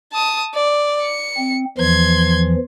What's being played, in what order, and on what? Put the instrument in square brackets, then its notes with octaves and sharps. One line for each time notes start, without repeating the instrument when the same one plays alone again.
[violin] A5 D#6
D5
C#7
[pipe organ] C4
[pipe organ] E2 E3 F3 [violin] C6 G#6